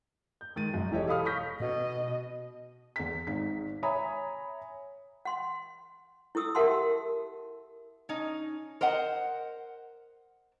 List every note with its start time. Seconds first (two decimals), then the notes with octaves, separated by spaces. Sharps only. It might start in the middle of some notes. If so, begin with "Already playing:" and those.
0.41 G6
0.56 D#3 G#3 A6 D#7
0.73 F#2 G#3
0.91 E1 E3 G4 A4 C#5 D#5
1.07 A4 F5 B5 D#6 F6
1.25 C#6 D#6 F6 G6 A#6 B6
1.60 B2 D#5
2.96 E2 B6
3.27 G#1 G#2 B6
3.83 C#5 E5 G#5 A#5 B5 D#6
5.25 F#5 C6
6.35 E4 A4 D#6 E6
6.55 G4 A#4 E5 F#5 A5 C6
8.09 C#4 D#4
8.81 A#4 C5 D#5 F#5